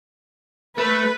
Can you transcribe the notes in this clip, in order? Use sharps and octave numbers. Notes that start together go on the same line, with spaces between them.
A3 B4